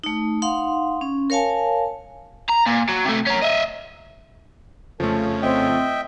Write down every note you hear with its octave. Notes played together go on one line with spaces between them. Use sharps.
A3 D#4
D#4 F5 F#5 C6
C#4
A#4 C#5 F5 G#5 A5
A#5
A#2
F#3
C3 A3
C#4 A#4
D#5 E5
F2 C#3 F3 A3 A4
C4 D#5 E5 G5